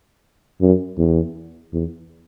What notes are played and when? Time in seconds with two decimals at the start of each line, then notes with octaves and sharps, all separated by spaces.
0.61 F#2
0.98 E2
1.73 E2